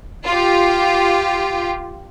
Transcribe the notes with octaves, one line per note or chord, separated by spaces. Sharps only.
F4 G4